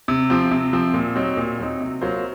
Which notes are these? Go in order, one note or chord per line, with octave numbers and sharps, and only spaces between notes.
C3
F3 C4
C3
F3 C4
A#2
F#3 C4 D#4
A#2
F#3 C4 D#4
C3
F#3 A#3 F4 C5